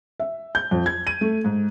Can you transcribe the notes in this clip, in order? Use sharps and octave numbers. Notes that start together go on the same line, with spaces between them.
E5
G6
F2
G#6
D#7
A3
G#2